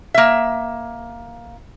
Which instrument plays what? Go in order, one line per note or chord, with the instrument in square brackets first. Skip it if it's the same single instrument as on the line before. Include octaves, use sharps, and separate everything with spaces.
[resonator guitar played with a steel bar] A#3 E5